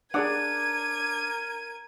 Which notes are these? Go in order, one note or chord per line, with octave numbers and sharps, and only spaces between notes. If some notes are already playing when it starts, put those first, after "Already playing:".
D4 G#4 A#4 D5 F#5 D6 G#6 D#7